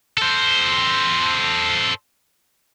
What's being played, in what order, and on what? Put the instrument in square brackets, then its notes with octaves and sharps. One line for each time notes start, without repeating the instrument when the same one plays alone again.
[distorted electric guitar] A4 C5